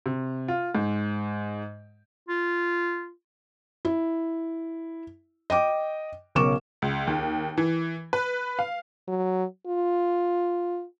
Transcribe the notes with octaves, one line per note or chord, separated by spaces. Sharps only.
C3
F4
G#2
F4
E4
D#5 G5 D6
B1 C#3 A#4 C#6 D6 E7
C#2
D#2
E3
B4
F5
F#3
F4